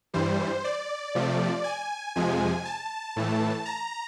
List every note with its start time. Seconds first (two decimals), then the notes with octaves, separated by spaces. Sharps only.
0.14 G2 E3 G3 C5
0.64 D5
1.15 C3 F3 A3
1.64 G#5
2.16 F2 C3 F3 G#3 G#5
2.65 A5
3.16 A2 E3 A3
3.65 A#5